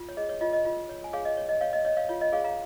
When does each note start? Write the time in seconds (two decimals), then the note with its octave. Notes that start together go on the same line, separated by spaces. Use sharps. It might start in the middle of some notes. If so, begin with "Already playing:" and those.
Already playing: F4
0.09 C#5
0.17 G#4 D#5
0.29 C#5
0.41 F4 D#5
0.53 D#5
0.65 F4
0.89 C#5
1.04 G#5
1.13 G#4 C#5 F5
1.25 D#5
1.37 C#5
1.49 D#5
1.61 C#5 F5
1.73 D#5
1.85 C#5 D#5
1.97 C#5 F5
2.09 F4 C#5
2.21 D#5
2.32 G#4 C#5 F5
2.44 F5 A#5